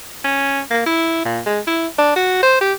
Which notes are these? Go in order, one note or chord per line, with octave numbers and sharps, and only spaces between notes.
C#4
A#3
E4
A#2
G#3
E4
D4
F#4
C5
G4